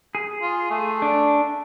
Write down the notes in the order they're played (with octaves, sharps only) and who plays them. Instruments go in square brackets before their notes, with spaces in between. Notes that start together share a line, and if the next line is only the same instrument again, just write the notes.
[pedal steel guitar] G#4
[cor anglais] F4
A3
[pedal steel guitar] D4